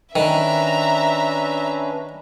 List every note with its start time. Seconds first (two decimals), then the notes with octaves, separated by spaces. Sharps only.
0.16 D#3 C#4 D4 B4 E5 A#5